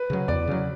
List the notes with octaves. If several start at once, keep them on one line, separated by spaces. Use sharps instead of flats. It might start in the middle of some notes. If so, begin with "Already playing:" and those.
Already playing: B4
C#3 F#3
E2 D5
C#3 F#3